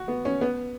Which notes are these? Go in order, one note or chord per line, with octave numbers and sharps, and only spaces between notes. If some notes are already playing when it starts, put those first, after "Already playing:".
Already playing: F#4
B3
C#4
B3